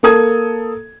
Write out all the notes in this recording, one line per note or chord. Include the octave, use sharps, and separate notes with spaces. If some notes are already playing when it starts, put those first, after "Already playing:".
A#3 A4 D#6 G#6